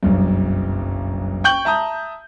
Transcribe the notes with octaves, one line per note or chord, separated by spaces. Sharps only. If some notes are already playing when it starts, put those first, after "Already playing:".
F#1 B1 G2
G5 C#6 G6 F#7 G7
E5 A5 A#5 D#6